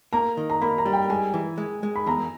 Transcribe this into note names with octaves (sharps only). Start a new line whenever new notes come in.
A#3 A#5
D#3
A#5
A#3 B5
A#5
G3
G5
G#3 G#5
E3
G#3
G#3
B5
E2 A#5